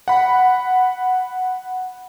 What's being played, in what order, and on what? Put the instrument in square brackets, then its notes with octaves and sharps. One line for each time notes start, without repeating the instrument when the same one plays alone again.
[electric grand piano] F#5 B5